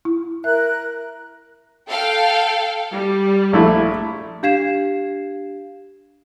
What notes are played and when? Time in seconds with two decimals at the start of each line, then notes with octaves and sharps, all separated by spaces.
0.05 E4
0.44 A#4 E5 F#6
1.89 A4 F5 G5
2.92 G3
3.53 A#1 A3 E4
4.43 D4 G4 F5 G#6 C7 E7